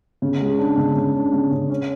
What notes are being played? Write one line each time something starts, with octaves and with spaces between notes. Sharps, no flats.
C#3
G#3
D4
C#3
C#3
D4
C#3
C#3
C#4